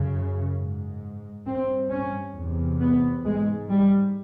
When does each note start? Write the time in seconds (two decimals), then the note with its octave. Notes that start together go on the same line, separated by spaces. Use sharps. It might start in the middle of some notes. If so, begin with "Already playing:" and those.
Already playing: F#2 C#3
0.56 G#2
1.45 G2 C4
1.90 C#4
2.36 E2 C3
2.81 B3
3.24 G#2 G#3
3.69 G3